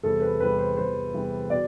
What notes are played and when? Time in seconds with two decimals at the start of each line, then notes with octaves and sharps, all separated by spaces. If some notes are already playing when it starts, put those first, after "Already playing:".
0.03 E2 C3 E3 G3 A4
0.22 B4
0.40 E2 C3 E3 G3 B4
0.59 C5
0.77 E2 C3 E3 G3 C5
1.14 E2 C3 E3 G3
1.50 B2 D5